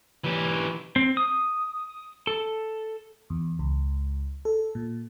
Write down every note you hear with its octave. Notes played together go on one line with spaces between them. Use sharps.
E3 G4
C4
D#6
A4
E2
C#2
A4
A#2